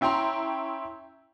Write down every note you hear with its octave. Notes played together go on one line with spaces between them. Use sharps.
C#4 E4 G5 A#5 C6